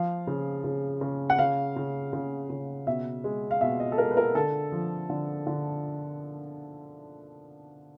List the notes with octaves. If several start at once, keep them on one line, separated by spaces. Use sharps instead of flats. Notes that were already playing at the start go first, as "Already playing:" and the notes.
Already playing: F3 F5
C#3
C#3
C#3
F#5
C#3 F5
C#3
C#3
C#3
B2 E5
G#3
F5
B2 E5
D#5
A4
G#3 A#4
B4
A#4
D3 A4
F3
D3
D3